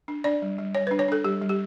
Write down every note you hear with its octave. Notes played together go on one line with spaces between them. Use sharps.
D4
D4 D5
G3
G3
G3 C#5
D4 B4
C#5
D4 A4
G3 G4
G3
G4